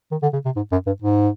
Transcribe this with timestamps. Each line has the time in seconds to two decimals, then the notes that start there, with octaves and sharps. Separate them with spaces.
0.11 D#3
0.22 D3
0.33 C#3
0.45 C3
0.56 G#2
0.72 F#2
0.86 G2
1.02 G#2